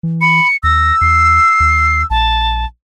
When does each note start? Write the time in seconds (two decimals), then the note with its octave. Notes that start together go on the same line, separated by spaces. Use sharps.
0.03 E3
0.21 B5 C#7
0.63 D#2 E6 A#6
1.01 E2 C7
1.60 D#2
2.10 A#1 A5